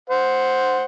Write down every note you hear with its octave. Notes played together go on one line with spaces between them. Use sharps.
C5 F#5